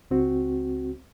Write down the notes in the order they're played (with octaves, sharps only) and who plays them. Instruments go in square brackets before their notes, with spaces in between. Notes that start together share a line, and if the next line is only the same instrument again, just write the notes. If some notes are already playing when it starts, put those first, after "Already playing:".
[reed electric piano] C#2 C4 F#4